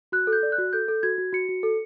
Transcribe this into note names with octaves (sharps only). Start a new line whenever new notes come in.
F#4 F#6
A4
G6
D5
F#6
F#4
A4 G6
A4
F#4 G#6
F#4
F#4 C#7
F#4
A4